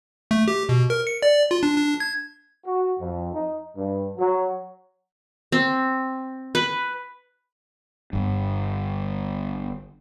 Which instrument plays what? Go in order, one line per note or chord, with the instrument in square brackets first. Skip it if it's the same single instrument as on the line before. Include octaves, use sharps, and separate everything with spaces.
[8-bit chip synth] A3
G4
B2
A#4
C#7
D5
F4
D4
D4
G#6
[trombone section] F#4
F2
D#4
G2
F#3
[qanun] C4
B4
[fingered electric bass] G1 G2